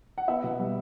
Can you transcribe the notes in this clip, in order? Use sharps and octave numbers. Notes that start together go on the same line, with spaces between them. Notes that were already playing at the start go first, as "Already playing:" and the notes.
F#5
B3 E5
B2
G3